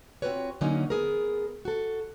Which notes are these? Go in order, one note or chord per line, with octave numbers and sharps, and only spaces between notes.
C4 F4 F#4 B4 C#5
D3 F#3 A#3 C#4 D#4
B3 G#4 A#4
F#4 A4